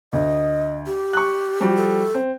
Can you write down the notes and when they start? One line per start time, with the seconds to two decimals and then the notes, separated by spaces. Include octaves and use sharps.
0.13 D2 D#5
0.86 G4
1.13 C#6 F#6
1.60 F3 G3 F#4
1.77 A4
2.14 C4